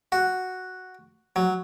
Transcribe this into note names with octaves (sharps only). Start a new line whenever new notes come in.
F#4
F#3